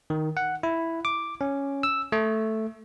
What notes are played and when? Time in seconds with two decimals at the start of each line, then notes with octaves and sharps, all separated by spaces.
0.10 D#3
0.37 F#5
0.63 E4
1.05 D6
1.41 C#4
1.83 E6
2.12 A3